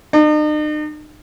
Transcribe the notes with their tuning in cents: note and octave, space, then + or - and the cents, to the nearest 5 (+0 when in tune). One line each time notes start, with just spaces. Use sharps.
D#4 -45